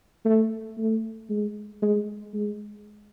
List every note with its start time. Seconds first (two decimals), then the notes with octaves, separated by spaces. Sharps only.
0.25 A3
0.78 A3
1.30 G#3
1.82 G#3
2.34 G#3